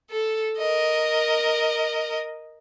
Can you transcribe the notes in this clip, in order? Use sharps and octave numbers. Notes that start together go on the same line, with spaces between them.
A4
A#4 D#5